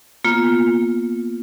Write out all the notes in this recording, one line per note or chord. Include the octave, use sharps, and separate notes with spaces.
A#3 B3 F4